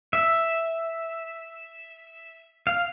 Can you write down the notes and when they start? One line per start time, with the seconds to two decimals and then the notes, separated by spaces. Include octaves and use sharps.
0.13 E5
2.67 F5